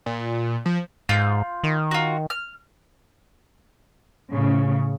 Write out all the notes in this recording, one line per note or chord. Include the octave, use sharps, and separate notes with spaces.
A#2
F3
G#2 F4 G6
D#3
F4 F#4
F6
A2 C#3